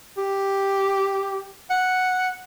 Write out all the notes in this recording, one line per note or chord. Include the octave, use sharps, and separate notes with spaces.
G4
F#5